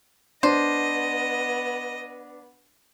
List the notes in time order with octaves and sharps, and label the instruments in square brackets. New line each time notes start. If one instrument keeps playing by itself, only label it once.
[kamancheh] B3 B4 [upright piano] D4 [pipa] C5 [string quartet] D#5